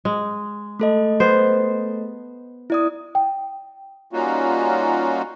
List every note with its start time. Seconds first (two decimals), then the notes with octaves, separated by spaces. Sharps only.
0.05 G#3
0.79 A3 A4 D#5
1.20 B3 C5
2.70 E4 D5 D#6
3.15 G5
4.13 G3 A#3 C#4 D#4 F4 F#4